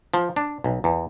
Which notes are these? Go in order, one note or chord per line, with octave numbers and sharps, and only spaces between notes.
F3
D4
B1
E2